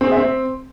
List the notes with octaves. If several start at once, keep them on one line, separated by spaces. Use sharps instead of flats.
C4
G#4
E5
C4